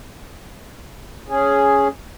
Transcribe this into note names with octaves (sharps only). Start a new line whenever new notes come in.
C#4 G#4